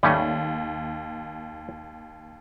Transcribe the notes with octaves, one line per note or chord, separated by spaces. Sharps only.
D#2 G3 A3 C#4